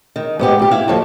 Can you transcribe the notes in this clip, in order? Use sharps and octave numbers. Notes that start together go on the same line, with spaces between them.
D#3
G#2 B3 G4
E2 G4
E4 F5
D#2 F3 A4